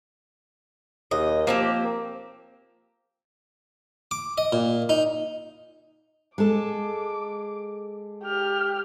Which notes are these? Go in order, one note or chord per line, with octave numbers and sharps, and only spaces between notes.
D#2 D#5
F3 A#3 C4 G4
D6
D#5
A#2
D#4
G#3 A4 D6
G4 F6